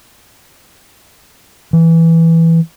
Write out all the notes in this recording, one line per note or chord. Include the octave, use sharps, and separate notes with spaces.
E3